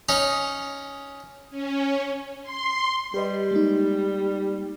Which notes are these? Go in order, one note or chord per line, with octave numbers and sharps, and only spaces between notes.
C#4 D#4
C#4
C6
G3 G4 B4 D#5
G#3 A#3 D#4